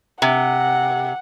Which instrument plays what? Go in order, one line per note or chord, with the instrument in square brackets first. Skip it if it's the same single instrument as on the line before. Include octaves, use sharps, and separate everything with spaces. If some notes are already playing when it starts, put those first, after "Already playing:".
[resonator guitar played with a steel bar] C3 [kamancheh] F#5